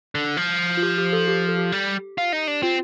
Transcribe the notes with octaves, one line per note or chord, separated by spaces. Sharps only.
D3
F3
F4
G4
G4
A4
G4
A4
G4
G3
F4
D#4
D4
C4 F4